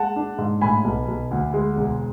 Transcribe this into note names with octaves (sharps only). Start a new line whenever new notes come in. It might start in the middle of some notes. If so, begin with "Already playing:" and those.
Already playing: G#3 F#5 A5
D4
G#2
A2 G#5 B5
B1
B1
D2
G#3
E1